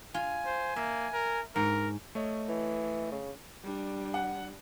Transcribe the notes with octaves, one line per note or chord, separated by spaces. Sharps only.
F4 G#5
C5
A#3 E5
A#4
G#2 A#4
A3 C#5 D#5
E3
C#3
G3 D4
F#5